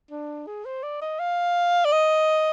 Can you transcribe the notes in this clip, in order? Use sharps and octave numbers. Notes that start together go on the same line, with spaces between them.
D4
G#4
C5
D5
D#5
F5
D5
D#5